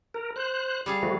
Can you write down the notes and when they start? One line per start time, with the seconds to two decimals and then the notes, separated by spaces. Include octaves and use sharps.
0.14 A#4
0.36 C5 F#6
0.86 G3 G#4 F5
1.03 F3 A3 F#4